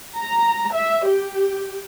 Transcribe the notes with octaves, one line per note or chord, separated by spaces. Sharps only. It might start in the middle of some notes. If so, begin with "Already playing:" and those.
A#5
E5
G4